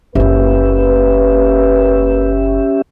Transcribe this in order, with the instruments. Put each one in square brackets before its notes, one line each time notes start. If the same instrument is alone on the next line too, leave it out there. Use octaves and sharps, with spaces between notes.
[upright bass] F#1 F4 [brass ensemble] A#3 B4 [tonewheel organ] C#4 G4 E5